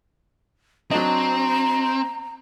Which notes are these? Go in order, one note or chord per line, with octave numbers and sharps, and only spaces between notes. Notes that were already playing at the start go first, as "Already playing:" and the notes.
F#3 C4 D4 D#5 A#5